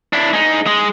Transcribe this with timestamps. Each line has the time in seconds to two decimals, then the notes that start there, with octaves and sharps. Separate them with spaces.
0.13 D4 E4
0.33 G#3 D#4
0.67 G#3